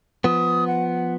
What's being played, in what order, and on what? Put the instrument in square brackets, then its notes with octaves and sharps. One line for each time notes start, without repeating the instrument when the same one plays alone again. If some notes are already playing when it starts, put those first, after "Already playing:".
[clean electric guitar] F3 B3 [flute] D#6
[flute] F#5